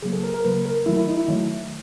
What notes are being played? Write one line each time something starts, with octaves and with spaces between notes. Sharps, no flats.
C#3 F#3 A#3 G#4
A4
A#4
A#4
C#3 F#3 A#3 B4
A#4
D#3 F#3 A3 E4
E4
D#4
E4
D#3 F#3 A3